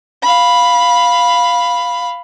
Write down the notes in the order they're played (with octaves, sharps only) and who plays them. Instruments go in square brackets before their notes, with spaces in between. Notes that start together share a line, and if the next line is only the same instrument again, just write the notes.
[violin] F5 B5